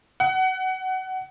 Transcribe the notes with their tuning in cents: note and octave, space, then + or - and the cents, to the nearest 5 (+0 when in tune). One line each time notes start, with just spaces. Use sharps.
F#5 +20